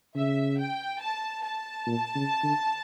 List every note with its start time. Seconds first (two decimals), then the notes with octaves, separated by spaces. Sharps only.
0.15 C#3 E5
0.58 G5
1.01 A5
1.44 A5
1.87 A#2
2.15 C#3
2.43 D3